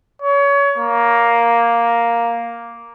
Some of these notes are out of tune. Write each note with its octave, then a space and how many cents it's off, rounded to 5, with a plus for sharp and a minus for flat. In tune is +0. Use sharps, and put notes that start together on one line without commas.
C#5 +25
A#3 +5